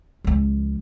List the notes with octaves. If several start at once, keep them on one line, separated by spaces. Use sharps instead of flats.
C#2 F3